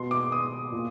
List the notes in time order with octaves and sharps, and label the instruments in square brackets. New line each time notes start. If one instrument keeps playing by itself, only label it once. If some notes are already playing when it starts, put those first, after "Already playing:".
Already playing: [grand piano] B2 C6
D6
D#6
A#2